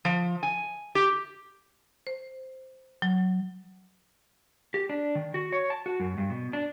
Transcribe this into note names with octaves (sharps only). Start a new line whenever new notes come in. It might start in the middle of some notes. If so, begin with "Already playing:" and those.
F3
G#5
G4
C5
F#3
G4
D4
D#3
F#4
C#5
A5
F#4
F#2
G2
B2
D4